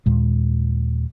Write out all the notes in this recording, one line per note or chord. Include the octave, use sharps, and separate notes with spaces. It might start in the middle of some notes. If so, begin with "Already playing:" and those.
D#2 A#2 G#3